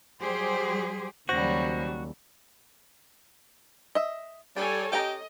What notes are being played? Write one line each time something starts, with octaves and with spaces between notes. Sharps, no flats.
F#3 G3 G4 G#4 C5
D#2 C#3 F#3 G3 F#4 C5 A#6
D#5 E5
G3 D4 A4 C#5 G#5
C#4 G4 D#5 G5 A#5